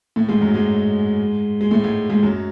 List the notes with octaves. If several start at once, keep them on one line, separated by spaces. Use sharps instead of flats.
A2 A3
G#2 G#3
F#2 F#3
G#2 G#3
G#3
A2 A3
G#2 G#3
G#2 G#3
F#2 F#3